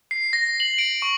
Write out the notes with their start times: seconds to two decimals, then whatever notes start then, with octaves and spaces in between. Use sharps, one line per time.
0.11 C7
0.33 A#6
0.60 F#7
0.78 D7
1.02 C#6